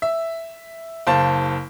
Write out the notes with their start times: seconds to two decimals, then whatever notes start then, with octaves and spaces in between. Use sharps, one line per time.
0.02 E5
1.07 F#1 C5 F5 A5